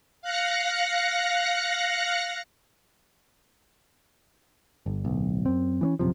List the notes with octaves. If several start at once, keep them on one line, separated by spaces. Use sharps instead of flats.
F5 F#6 A#6 C#7
G1
D1 B1
F#2 C4
E3 B3 C#4
A#1 F#2 C3 F3